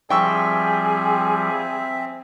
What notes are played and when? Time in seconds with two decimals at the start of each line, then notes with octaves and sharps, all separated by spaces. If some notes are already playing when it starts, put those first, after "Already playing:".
0.10 F3 G3 C4 G#4 E5 G5 C#6 E6